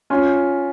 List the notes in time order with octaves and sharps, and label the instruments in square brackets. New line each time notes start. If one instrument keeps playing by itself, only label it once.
[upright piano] C#4 F4